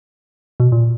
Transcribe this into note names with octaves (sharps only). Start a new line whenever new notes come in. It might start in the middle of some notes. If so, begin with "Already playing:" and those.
B2
A#2